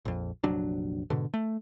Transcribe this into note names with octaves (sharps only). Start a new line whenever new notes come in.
A#1 F2
F1 A#1 F#3 D4
G#2 B2 D3
A3